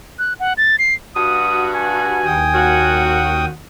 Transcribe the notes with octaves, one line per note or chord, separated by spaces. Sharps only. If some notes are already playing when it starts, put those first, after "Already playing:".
F#6
F#5
A6
C7
G2 F#4 D#6
G#5
D#2 G5 D#6
A#2 C#4 F#4